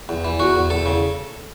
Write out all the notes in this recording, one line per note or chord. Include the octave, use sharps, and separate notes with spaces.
E2
E3
E2 F#4
E2
E2 A4
C#3